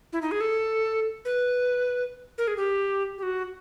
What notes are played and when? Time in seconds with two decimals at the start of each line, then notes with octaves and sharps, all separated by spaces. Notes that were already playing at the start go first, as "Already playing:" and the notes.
0.13 E4
0.22 D#4
0.31 G#4
0.40 A4
1.25 B4
2.38 A#4
2.47 G#4
2.57 G4
3.18 G4
3.23 F#4